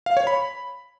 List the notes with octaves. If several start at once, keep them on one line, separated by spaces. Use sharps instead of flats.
F5
C#5
B5